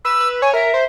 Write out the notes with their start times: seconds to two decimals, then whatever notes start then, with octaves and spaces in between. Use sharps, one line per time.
0.05 B4 E6
0.20 B4
0.42 C#5 G#5
0.53 A#4 E5
0.74 C5